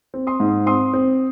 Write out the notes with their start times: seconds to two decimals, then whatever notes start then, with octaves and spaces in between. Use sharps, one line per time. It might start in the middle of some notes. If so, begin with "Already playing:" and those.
0.14 C4
0.27 C6 D#6
0.40 G#2
0.66 C4 C6 D#6
0.94 C4